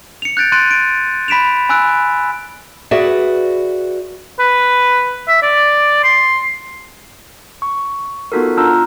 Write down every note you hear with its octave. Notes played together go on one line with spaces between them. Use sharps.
C#7 F7
F#6 G6 A6 D7
C6 F#6 A6 D7 D#7
D7
B5 B6 D7 E7 F7
G#5 B5 E6 F#6 D7
F#4 G#4 B4 D5 E5
B4
E5
D5
C6
C#6
B3 D#4 F4 F#4 A4 A#4
D4 F4 A#5 E6 F6